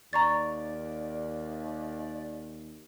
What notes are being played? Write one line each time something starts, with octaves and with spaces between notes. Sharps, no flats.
D#2 D5 A#5 C#6 A6